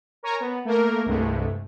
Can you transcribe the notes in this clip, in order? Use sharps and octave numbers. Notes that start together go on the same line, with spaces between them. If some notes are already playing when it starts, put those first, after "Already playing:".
A#4 C#5 G#5 A#5
B3
A3 A#3 A#4
C2 G2 G#3 A3